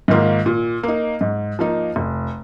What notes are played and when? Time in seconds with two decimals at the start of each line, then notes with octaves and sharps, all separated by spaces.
0.08 G#2 D#3 A#3 F4
0.46 A#2
0.83 A#3 D#4
1.21 G#2
1.59 F3 A#3 D#4
1.96 F1